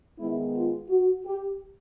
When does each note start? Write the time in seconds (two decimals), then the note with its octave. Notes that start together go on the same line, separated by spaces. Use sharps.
0.18 D#3 G#3 B3 E4
0.55 F4
0.90 F#4
1.25 G4